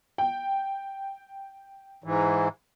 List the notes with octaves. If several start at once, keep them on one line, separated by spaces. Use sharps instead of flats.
G5
G#2 E3